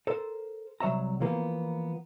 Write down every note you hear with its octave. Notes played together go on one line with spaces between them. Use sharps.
A4 A#4 C5
C2 F#3 C#5 E5 A#5
E3 F3 A#3 B3